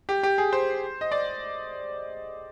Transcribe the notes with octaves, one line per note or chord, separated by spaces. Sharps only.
G4
G4
G#4
C5
D#5
D5